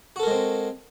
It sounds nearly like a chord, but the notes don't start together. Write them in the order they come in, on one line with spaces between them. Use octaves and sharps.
F#4 A4 A#4 G#3 C4